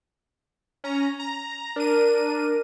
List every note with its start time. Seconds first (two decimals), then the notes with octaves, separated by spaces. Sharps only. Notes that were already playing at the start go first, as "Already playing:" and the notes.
0.84 C#4 A#5
1.19 A#5
1.76 D4 A#4 D#7